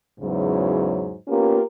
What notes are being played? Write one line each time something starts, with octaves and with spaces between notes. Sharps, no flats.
E2 G#2 C#3 E3 F#3
A#3 B3 C#4 F4 G4 A#4